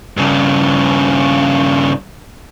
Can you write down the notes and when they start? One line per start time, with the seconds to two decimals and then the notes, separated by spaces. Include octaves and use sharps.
0.17 G2 C#3